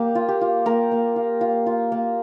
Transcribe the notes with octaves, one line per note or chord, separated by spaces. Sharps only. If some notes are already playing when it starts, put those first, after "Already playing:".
Already playing: A#3 G4
F4
G4
F4
A#3 A#4
A#3
F4
F4
F4
A#3